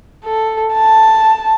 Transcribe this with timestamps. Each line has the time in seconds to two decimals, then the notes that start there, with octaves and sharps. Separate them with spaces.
0.25 A4
0.75 A5